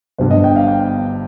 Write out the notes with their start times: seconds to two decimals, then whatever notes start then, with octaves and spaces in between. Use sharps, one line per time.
0.18 G1 G2 D3 C5
0.31 D#5
0.44 G5
0.56 F5
0.68 G5